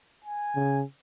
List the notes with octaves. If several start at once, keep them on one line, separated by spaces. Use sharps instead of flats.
G#5
C#3